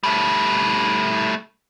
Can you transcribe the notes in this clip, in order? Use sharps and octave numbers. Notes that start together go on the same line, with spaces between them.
G3 A3